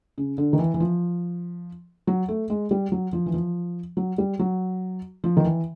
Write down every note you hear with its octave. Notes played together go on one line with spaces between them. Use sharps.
C#3
D3
D#3
E3
E3
F3
F#3
A3
G#3
G3
F#3
F3
E3
F3
F#3
G3
F#3
F3
D#3
E3